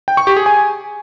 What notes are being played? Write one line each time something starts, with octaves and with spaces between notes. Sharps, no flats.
G5
C#6
G4
G#4
G#5